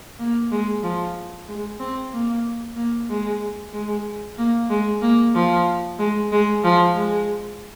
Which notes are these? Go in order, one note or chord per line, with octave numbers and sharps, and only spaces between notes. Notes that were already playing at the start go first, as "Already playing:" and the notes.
A#3
G#3
F3
G#3
C4
A#3
A#3
G#3
G#3
A#3
G#3
A#3
F3
G#3
G#3
F3
G#3